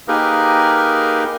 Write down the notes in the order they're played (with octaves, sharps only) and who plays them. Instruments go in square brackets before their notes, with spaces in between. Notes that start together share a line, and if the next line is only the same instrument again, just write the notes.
[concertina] A#3 D#4 G4 G#4 A#4 B4